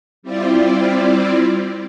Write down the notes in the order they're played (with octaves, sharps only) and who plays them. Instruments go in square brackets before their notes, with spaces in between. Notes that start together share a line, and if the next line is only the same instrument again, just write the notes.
[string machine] G3 C4 E4 F4 D5